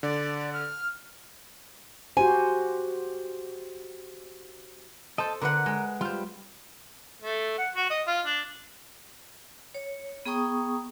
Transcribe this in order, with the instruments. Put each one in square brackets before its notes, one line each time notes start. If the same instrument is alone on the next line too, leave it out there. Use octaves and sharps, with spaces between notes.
[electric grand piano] D3 [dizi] D5
[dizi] F6
[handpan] F#4 G4 C5 [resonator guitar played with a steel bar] G#5
[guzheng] A4 C5 [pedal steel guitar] D#5 A5
[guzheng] D3 B4 F#5 [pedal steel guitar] A#4
[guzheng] G#3
[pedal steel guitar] G3 F6 [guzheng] F4 C5
[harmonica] A3
F#5
F#4
D#5
F4
D4
[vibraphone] C#5
B3 G#4 G5 A#5 C#6 D#6